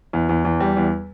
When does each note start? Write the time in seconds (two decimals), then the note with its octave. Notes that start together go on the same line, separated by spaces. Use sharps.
0.13 E2
0.29 E2
0.45 E2
0.60 G3
0.77 E2